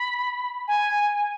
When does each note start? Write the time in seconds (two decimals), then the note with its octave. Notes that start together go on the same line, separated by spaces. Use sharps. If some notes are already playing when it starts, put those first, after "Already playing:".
Already playing: B5
0.68 G#5